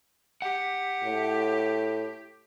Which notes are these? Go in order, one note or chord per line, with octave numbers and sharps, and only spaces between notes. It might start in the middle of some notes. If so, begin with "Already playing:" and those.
G4 F#5
A2